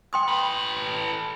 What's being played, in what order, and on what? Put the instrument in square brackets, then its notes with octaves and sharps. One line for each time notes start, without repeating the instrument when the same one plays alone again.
[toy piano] G5 C6 D#6
[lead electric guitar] A4 B4